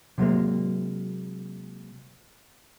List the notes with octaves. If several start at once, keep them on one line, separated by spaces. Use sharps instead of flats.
C3 F#3 G#3 A#3